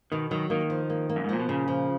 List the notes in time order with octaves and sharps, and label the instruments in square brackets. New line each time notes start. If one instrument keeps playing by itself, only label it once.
[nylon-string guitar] B2 [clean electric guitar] D#3
[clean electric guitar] D#3 [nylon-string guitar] F#3
[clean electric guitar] D#3 [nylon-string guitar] A#3
[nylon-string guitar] F3
A#3
A#3
[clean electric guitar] F#2
G#2
[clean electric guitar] A#2 [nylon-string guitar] F3
[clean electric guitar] B2
[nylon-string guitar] A#2 [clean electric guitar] C#3
[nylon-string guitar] F3